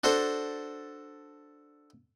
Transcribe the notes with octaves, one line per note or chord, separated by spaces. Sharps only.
D4 F#4 A4 C5